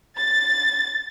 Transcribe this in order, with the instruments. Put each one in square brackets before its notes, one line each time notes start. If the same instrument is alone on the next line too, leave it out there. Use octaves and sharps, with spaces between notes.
[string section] A6